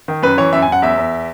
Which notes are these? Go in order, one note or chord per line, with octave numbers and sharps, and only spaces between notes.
D#3
F#2 B4
E3 C#5
F#2 E5
G#5
F#2 F#5
E2 E5
E2